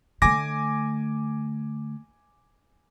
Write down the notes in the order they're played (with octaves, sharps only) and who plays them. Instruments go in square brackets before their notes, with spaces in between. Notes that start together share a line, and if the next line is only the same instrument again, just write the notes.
[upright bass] D3 A3 [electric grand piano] G#5 D6 A#6